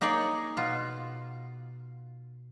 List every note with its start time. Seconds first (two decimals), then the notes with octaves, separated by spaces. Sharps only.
0.01 A#3 D#4 G#4 C#5 D5 G#5
0.57 B2 F4